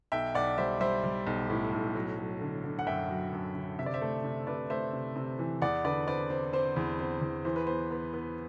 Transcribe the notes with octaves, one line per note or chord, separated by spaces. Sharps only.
B1 E5 G5
B1 D5 F#5
G3 C5 E5
G3 C5 E5
G3
B1
A2
B1
F#3
F#3
D3
D3
F#5
F#2 E5 G5
F#3
F#2
D3
C3 E5
D5
C5 E5
A3
C3
C3 B4 D5
A3 C5 E5
C3
C3
E3
E2 D5 F#5
D3 B4 D5
C4 B4 D5
C4
C4 C5
E2
C4
E2
E3 C5
B4
B3 C5
B3
B3